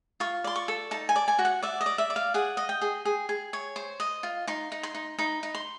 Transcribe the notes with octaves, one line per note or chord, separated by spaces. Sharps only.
F4 C#6
D5 C6
C#6
A4
D#4 A5
G#5
D5
G#5
F#4
F#5
D5 E5
D#5
D5
E5
D5
F5
G#4 F#5
D#5
G5
G#4
G#4
G#4
C#5
C5
D#5
F4
D#4 C6
D#4
C6
D#4
D#4 B5
D#4
C6